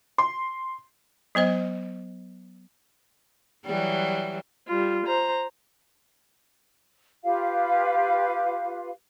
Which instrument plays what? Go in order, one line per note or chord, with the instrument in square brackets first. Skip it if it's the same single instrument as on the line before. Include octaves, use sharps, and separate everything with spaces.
[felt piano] C6
[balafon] F#3 B3 C5 D#5
[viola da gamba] E3 F#3 G3
[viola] G3 F4
C5 A#5
[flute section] F4 G4 B4 F5